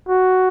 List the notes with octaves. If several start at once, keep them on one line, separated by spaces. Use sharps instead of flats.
F#4